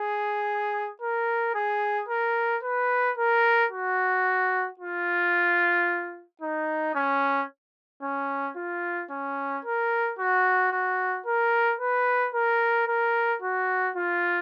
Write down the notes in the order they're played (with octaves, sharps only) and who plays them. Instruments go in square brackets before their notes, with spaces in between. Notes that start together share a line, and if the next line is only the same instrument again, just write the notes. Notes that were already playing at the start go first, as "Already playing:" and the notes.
Already playing: [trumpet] G#4
A#4
G#4
A#4
B4
A#4
F#4
F4
D#4
C#4
C#4
F4
C#4
A#4
F#4
F#4
A#4
B4
A#4
A#4
F#4
F4